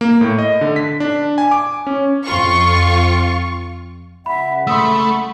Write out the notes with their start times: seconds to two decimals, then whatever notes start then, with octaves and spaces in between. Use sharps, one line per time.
0.01 A#3
0.21 A2
0.38 D#5
0.61 D3
0.76 B6
1.00 D4
1.38 G#5
1.51 D6
1.87 C#4
2.26 F2 F4 C#6
4.26 C#2 E5 F#5 B5
4.67 A3 B5 C6 D#6 E6